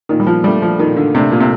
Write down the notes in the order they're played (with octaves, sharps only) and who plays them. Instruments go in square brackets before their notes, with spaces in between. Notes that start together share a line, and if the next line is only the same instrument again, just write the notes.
[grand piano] A#2 [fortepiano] D#3
[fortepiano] G3
F3
[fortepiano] G3 [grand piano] A3 D4
[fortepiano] F3
[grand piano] A#2 [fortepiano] D#3
[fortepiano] D3
[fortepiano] C3 [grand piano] A3 D4
[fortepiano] A#2
C3